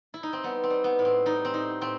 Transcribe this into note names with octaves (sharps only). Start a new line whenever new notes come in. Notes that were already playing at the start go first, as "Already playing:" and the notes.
E4
D#4
C4
G3 B3
C4
G3
B3
A2
C4
G3 D#4
C4
A2 D#4
A2 C4